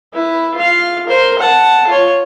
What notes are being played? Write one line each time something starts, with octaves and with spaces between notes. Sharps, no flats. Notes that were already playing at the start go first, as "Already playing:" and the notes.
E4 B4
F4 F5
A#4 C5
F#5 A5
F4 C#5